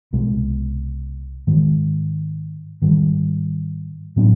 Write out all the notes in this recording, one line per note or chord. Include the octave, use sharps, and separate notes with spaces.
C2 B2 G#3
G#2 D#3 G#3
G#2 D#3 G3
A2 F#3 B3 D4